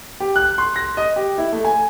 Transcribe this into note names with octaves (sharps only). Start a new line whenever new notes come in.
G4
F#6
C6
A#6
D#5
G4
E4
A3
G#5